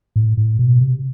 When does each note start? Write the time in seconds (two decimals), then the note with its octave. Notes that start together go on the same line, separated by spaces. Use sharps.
0.16 A2
0.37 A2
0.59 B2
0.81 C3